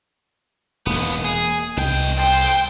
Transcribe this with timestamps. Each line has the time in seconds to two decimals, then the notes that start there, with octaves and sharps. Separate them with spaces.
0.86 E1 D#2 A#3 B3
1.24 G#4
1.77 C2 B2 G5
2.19 A4 C5 G5